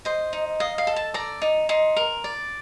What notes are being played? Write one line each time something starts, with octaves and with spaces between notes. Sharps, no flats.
C5 D#5
D#4
D#5 F5
F5
A4
A5
D5 A#5
D#4
D#4 C6
A#4
D5